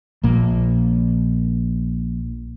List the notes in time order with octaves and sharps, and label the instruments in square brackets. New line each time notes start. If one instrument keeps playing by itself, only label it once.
[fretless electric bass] A#1 A#2 A#3